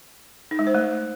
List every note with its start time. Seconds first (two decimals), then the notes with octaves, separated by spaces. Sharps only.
0.51 D#4
0.59 G#3
0.67 C5
0.75 A3